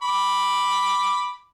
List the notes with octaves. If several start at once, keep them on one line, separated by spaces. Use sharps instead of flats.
B5 D6